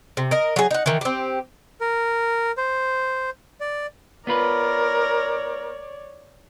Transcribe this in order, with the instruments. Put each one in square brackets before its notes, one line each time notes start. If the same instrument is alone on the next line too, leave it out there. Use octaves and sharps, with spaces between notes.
[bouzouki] C3
A#4 D#5
F#3 G#4
D#4 F#5
D#3 E3
C4 G4
[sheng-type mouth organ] A#4
C5
D5
[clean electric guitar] B3 F4 B4 [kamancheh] A#4 [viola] C#5 D5